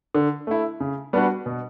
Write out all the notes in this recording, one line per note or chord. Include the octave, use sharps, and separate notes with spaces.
D3
A3 E4
C#3
G3 B3 D4 F#4
B2